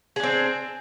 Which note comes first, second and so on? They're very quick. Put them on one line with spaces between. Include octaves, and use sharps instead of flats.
G#4 D4 C4